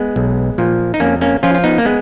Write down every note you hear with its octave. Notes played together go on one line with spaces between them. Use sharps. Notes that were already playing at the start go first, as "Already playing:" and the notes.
Already playing: G#3 B3
B1
A#2 F3
D#4
F2 A#3 C#4
A#3 C#4
F3 C#4 F4
F4
B3 D#4
A#3
G#3 B3